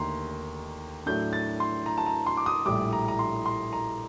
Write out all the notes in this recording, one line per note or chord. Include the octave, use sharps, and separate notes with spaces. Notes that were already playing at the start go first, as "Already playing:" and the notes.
Already playing: D#2 D3 A3 A#5 C6
A2 F#3 A3 D4 G6
A6
C6
A#5
A5
A#5
C6
D6
D#6
A#1 A2 G3 D6
A#5
A#5
C6
C6
A#5